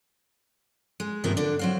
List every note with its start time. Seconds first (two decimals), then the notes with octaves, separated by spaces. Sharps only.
1.00 G#3
1.24 G2 C3 D#3 F3 B3 A#4
1.37 D3 D4
1.59 F#3 C4 F5